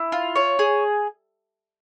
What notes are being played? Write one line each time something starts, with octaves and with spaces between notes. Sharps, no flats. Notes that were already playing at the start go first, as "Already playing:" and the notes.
Already playing: E4
F4
C#5
G#4